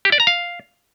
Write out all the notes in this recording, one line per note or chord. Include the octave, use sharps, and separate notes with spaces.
G4
D5
A#5
F5